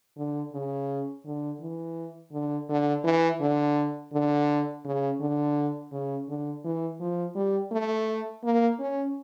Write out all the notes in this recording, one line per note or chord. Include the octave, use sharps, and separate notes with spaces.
D3
C#3
D3
E3
D3
D3
E3
D3
D3
C#3
D3
C#3
D3
E3
F3
G3
A3
A#3
C#4